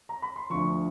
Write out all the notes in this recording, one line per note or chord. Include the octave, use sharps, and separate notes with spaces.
A#5
B5
C6
D2 D3 F3 C#6